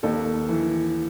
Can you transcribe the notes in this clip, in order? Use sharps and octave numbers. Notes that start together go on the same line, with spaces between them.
D#2 A4
E3